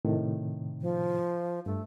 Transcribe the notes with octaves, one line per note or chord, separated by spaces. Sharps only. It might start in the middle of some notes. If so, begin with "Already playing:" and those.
A2 C3 D#3
F3
G2 A3